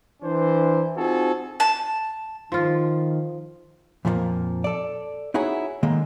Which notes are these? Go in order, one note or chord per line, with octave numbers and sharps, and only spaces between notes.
E3 D4 C5
C4 D#4 F4 F#4 G#4 A4
A5
D#3 F3 F4
F2 A#2 F3 G3 A#3
A4 D5
D#4 E4 F#4 G#4 C#5
D3 D#3 G#3 A#3